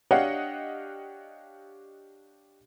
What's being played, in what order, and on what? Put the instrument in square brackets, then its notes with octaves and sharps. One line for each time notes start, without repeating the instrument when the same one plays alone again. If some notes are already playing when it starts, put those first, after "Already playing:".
[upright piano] D4 G4 C#5 D#5 F5 F#5